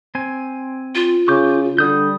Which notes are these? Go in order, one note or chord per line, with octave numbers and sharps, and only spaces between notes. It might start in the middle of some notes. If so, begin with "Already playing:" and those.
C4 G#5
F4
C#3 C#6 D6 G6
D3 G3 D#6 G6